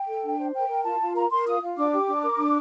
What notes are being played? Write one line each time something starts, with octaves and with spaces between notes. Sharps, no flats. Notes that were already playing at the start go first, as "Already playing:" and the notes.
Already playing: G5
A4
D4
C5
A#4 G5
A#4
F4 A5
F4
A#4 A#5
A#4 C6
F4 D#6
F4
D4 D6
G4
D4
A#4
D4